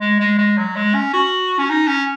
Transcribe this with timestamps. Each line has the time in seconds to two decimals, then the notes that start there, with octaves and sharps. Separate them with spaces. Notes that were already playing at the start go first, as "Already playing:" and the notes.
0.01 G#3
0.20 G#3
0.38 G#3
0.58 F#3
0.76 G#3
0.94 C#4
1.13 F#4
1.59 C#4
1.70 D#4
1.87 C#4